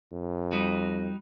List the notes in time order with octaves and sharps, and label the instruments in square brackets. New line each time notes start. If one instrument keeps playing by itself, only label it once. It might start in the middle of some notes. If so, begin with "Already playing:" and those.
[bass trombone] F2
[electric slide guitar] G3 D#4 F#4